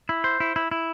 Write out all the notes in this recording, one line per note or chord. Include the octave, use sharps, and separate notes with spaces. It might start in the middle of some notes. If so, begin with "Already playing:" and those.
E4
C5
E4
E4
E4